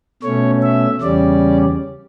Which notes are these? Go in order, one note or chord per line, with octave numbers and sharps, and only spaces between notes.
B2 A3 C#4 C#5
E5
E2 C#3 G3 C#4 D5